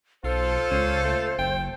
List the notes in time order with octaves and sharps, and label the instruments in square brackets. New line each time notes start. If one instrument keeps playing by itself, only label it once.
[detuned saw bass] B1 [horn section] F4 A4 [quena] C5
[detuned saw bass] C#2 [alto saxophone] C#4
[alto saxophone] A3
[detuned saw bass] F#1 [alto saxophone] G5